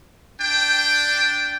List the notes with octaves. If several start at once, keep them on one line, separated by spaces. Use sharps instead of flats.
D4 G5